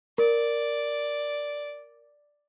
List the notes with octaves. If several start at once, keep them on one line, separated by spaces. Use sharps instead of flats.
A#4 D5